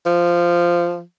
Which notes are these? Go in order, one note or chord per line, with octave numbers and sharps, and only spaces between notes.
F3